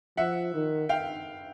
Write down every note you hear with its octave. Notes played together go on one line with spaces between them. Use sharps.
F3 E5 F#5
D#3
F5 G5